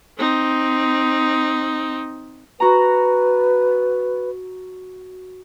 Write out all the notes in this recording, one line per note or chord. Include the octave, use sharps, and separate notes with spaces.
C4 D#4
F#4 B4 A#5